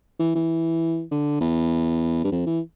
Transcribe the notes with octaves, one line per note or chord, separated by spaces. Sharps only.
E3
E3
D3
E2
G2
F2
E3